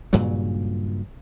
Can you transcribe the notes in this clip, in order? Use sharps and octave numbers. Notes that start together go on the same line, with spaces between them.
G2 A#2 C#3 F#3